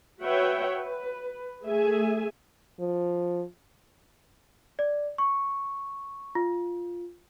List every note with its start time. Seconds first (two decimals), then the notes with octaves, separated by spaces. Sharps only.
0.22 F#4 B4 C#5 E5 F#5 G5
0.77 B4
1.67 A3 G#4 E5 G#5
2.79 F3
4.79 D5
5.18 C#6
6.35 F4